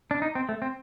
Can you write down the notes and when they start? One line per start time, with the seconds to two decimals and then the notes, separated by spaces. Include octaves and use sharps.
0.11 D4
0.22 D#4
0.35 C4
0.49 A3
0.62 C4